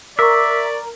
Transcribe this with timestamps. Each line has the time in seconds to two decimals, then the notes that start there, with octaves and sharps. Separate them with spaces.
0.19 A#4 D5 E5 C#6 D6